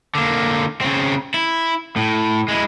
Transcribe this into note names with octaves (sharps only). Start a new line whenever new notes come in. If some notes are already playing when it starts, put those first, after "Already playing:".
D3 A#3
C#3 C4
E4
A2
G#3 E4